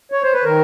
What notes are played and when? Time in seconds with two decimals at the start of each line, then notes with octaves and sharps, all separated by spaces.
0.12 C#5
0.23 C5
0.33 B4
0.44 D#3 A#4